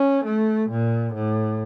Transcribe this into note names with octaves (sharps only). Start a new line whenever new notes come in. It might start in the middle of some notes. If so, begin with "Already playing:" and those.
Already playing: C#4
A3
A#2
A2